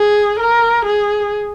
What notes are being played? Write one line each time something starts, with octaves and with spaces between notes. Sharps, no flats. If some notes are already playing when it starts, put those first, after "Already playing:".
Already playing: G#4
A#4
G#4